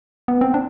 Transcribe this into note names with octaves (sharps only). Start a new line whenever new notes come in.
B3
C4
D4